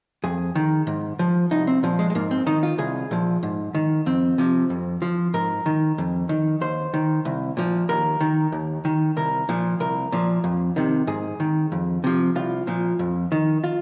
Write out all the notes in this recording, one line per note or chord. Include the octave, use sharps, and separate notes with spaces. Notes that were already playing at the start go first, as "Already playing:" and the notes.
F2 G#4
D#3
G#2
F3
C2 D#4
C4
A#2 F3
G#3
G#3
G#2 A#3
C4
D#3 D#4
F4
C2 G#4
A#2 F3
G#2
D#3
F2 C4
C3 F3
F2
F3
G#2 A#4
D#3
F2
D#3
D#2 C5
D#3
C2
A#2 F3
D#2 A#4
D#3
D#2
D#3
C2 A#4
A#2 F3
C2 A#4
A#2 F3
F2
C3 D#3
G#2 G#4
D#3
F2
C3 F3
C2 F4
A#2 F3
F2
D#3
F4